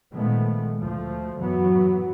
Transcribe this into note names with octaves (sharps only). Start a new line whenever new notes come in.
A#2 D#3 F3 G#3 A3 B3
D2 F3 A3
F#2 A2 E3 F#3 B3